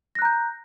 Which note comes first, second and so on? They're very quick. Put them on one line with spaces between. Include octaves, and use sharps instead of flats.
A#6 F#6 A#5 G6